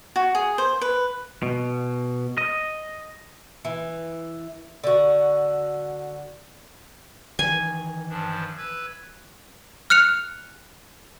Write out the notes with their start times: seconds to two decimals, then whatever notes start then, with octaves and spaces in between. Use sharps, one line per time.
0.16 F#4
0.35 G#4
0.58 C5
0.81 B4
1.43 B2
2.38 D#5
3.65 E3
4.84 D3 F#4
7.39 D#3 E3 G#5
8.09 G2 F3 D4
8.57 B4 E6 G#6
9.90 F6 F#6 C#7 F7